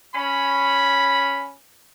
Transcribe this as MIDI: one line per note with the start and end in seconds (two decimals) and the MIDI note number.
0.15 1.53 61
0.15 1.53 83